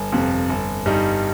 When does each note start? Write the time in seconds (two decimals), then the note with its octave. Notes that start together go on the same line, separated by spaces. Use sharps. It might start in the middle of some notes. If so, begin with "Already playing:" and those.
Already playing: G1
0.12 F2 C3
0.49 G1
0.86 G2 G3 D#4